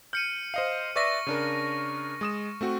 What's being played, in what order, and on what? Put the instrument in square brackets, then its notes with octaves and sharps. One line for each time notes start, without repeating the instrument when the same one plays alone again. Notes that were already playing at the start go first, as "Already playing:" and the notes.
[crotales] F6 C#7 D#7 [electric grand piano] G6
[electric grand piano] C5 D#5 F5
[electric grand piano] B4 D5 E5 [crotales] C#6 A#6
[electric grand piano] C#3 D4 A#4
G#3 D#6 E7
A3 C4 F#4